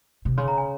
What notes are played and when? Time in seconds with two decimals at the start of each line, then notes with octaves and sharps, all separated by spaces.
0.25 C3
0.37 C#3 C6
0.48 A#5
0.58 G#5